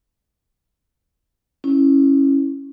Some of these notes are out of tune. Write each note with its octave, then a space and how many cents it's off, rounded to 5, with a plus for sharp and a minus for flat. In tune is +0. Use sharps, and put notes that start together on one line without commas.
C#4 -15 E4 -15